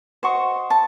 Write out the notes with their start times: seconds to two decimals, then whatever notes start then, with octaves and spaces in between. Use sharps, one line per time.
0.23 F#4 C5 D#5 C#6
0.70 A5